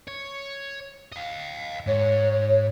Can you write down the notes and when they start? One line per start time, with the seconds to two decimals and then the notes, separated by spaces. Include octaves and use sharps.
0.08 C#5
1.12 D#5 F5
1.87 G#2 C#5